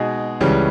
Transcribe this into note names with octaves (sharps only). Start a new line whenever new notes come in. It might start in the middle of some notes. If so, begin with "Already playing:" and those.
Already playing: B2 G#3 D#4 G#4
C#2 C#3 E3 G3 C#4